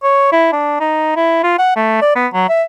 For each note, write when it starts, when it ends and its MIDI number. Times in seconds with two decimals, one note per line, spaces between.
0.03 0.28 73
0.32 0.47 64
0.52 0.78 62
0.80 1.12 63
1.16 1.39 64
1.43 1.55 65
1.58 1.73 78
1.76 1.97 57
2.01 2.14 74
2.15 2.27 59
2.33 2.48 54
2.49 2.63 76